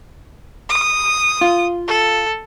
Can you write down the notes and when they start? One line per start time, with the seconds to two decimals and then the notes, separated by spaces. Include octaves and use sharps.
0.69 D#6
1.41 F4
1.87 A4